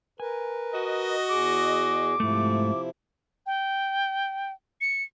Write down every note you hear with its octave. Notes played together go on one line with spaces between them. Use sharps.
A#4 B4 G#5
F#4 D#5
E2 G#4 D6
G#2 C3 F3 A3 E4
G5
C#7